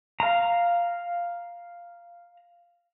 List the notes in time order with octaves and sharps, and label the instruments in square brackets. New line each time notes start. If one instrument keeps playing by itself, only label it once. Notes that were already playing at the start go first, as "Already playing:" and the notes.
[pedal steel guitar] F5 A#5